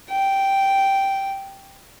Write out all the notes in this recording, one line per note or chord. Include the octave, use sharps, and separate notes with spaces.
G5